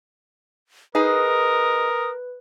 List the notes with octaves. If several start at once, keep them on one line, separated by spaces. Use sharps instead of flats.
D#4 G#4 A#4 B4 D#6